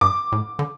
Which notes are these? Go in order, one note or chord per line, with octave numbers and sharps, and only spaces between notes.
G2 D6
A2
D3